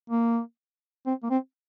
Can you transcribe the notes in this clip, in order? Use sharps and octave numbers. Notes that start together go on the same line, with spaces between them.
A#3
C4
A#3
C4